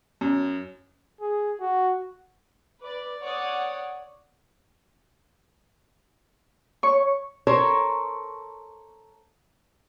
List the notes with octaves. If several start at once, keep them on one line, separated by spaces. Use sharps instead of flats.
F#2
G#4
F#4
B4 D5
C#5 D5 F#5 D#6
C#5 C#6
A4 A#4 C5 C#5